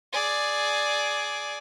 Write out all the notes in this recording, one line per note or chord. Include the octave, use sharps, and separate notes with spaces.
G#4 D5